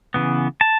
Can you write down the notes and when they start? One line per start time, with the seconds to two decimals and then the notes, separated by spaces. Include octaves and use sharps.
0.14 C#3 E3 B3
0.61 A5